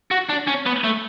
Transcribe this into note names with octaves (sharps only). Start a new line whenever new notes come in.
F#4
D4
C#4
B3
A3